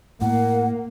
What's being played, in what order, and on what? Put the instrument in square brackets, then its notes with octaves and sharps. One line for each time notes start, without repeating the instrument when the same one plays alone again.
[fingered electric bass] A2 [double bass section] A#3 [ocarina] F#5